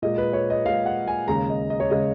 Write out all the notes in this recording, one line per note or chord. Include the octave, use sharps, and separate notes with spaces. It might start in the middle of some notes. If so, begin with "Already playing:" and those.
A#2 G#3 D#5
B4
C#5
D#5
A#2 G#3 F5
F#5
G#5
D#2 C#3 G#3 A#5
D#5
D#5
C#5
C#3 G#3 D#5